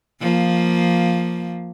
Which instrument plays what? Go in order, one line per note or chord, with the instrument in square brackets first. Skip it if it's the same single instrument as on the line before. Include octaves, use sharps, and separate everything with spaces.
[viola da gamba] F3 A#3